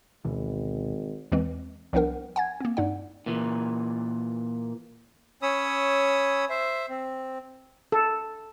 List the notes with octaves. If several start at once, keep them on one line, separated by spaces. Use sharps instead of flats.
G#1 D2 B2 E3
E2 E3 G#3 C4
C2 F3 B3 D4 A#4 F#5
F#5 G#5 G#6
A#3 C4
G2 D#4 D5 F#5
A#2 E3
C#4 C#5 B5 D#6 E6
C5 E5
C4
A4